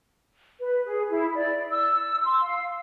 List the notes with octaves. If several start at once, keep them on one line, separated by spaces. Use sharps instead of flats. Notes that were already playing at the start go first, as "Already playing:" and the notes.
B4
G#4
E4
D5
E6
C6
F5